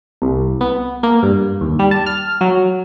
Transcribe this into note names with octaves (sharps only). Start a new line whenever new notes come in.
C2
B3
A#3
G2
D#2
G3
A5
F6
F#3